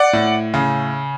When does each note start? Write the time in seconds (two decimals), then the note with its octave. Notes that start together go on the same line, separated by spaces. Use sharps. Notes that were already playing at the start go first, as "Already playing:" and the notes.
Already playing: D5 F#5
0.13 A2
0.54 C#3